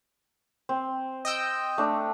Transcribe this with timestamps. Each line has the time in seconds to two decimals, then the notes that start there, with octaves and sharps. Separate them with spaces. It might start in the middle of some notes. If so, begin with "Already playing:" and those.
0.69 C4
1.25 D#5 G5 E6
1.78 A3 D4